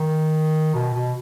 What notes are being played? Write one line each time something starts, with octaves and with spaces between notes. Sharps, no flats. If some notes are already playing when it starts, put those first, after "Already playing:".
Already playing: D#3
B2
B2